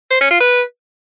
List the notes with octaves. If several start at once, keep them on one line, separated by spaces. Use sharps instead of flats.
C5
C#4
F4
B4